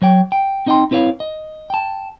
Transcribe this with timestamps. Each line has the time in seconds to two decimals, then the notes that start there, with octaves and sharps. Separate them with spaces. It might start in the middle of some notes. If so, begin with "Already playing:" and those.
0.02 F#3 C#5 G5
0.32 G5
0.66 C4 D#4 D#5 F5 G5 C6
0.91 C4 E4 B4 C#5 F5
1.20 D#5
1.70 G5 A5